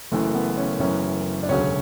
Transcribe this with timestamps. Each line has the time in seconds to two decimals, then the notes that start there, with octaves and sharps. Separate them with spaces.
0.12 F#1 F#2 E3 A3
0.35 B3
0.57 C#4
0.80 F#1 F#2 E3 C#4
1.43 D4
1.49 E1 D2 C#3 F#3 C#4